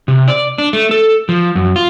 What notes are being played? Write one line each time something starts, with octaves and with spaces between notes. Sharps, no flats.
C3
D5
D4
A3
A4
F3
F#2
F4